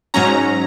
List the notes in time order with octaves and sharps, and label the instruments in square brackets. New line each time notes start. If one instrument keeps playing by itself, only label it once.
[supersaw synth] G#2 F#3 C#4 A#5